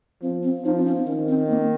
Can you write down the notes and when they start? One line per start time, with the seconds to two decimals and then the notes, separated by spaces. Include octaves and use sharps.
0.22 F3 C4
0.43 C4
0.64 F3 D#4
0.79 C4
0.85 C#4
1.06 D#3 C#4
1.28 C4
1.49 A#3